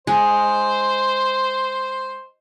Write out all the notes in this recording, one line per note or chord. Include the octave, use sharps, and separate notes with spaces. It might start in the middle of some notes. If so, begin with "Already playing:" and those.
G#3 C5